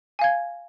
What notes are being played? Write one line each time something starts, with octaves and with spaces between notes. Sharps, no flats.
F5 G#5 G#6